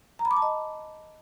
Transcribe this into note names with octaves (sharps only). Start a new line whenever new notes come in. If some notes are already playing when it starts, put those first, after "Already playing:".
A#5
B5
D6
A5
D#5